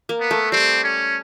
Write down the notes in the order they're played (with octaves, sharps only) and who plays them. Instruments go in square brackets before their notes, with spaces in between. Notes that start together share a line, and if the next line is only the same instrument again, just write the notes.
[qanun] A#3
[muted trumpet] B3
[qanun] A3
[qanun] G3 [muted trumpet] C4
[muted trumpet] C#4